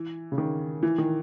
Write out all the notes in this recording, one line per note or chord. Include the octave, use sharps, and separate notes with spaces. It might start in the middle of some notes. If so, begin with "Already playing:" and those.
Already playing: E3
C#3
D#3
E3
D#3